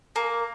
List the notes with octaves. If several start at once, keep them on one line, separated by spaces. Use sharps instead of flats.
A#3